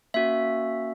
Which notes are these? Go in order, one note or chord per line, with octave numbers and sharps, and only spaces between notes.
A#3 C#4 F#4 E5